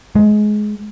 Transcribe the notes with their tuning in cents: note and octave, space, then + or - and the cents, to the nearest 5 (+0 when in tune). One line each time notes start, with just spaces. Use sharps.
G#3 +20